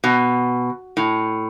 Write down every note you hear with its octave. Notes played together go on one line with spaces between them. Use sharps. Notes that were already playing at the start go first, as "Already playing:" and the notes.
B2
A2